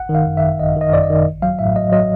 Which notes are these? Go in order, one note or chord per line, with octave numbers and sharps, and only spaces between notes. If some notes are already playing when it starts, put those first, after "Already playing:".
Already playing: G#1 F#5
D#3
F5
F#2
G#1 E5
G#1 D#5
D#3
D#5
F#2 D5
D#5
D#3
A1
F#3 F5
A2 E5
F#3 D#5
F#3 D#5